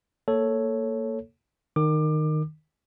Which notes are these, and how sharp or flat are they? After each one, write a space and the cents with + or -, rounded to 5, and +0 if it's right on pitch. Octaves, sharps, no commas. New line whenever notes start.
A#3 -15 A4 +0 C#5 +0
D#3 -15 D6 +25